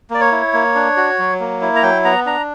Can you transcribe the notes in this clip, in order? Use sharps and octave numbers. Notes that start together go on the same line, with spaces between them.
A#3 D5
C#5
E4
A#3
D4
F#4
F#3
A#3
E4
A#5
F#3 G5
B3 A#5
D4 A#5